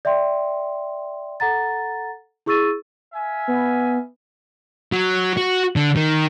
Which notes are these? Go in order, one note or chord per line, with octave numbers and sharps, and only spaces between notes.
D5 E5 G5 C6
A4 F#5 A#5 A6
E4 G#4 C#6 E6 A6 D#7
E5 F5 G#5
B3
F#3
F#4
D3
D#3